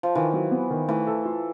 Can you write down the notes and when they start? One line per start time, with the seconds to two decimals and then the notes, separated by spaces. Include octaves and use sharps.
0.03 F3
0.15 D#3 E3
0.33 F#3
0.51 B3
0.70 D#3
0.88 E3 A3
1.07 A4
1.25 F4